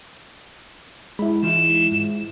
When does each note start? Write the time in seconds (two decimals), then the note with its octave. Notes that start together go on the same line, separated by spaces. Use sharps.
1.19 G#3 E4 B5
1.43 E3 D#4 F4 E7
1.91 G#2